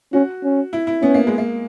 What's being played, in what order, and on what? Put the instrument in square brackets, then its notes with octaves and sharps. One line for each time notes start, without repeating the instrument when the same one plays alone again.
[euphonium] C#4 [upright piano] F#4
[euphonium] C#4
[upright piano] E4
E4
[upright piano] B3 [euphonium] C#4
[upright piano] A#3
G#3
A#3